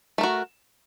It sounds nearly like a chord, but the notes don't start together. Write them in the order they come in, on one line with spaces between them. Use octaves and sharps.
A3 A#4 F#4